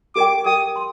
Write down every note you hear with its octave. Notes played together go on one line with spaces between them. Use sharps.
G4 A#4 D#5 G5 D6
G4 A#4 D#5 G5 D#6
C6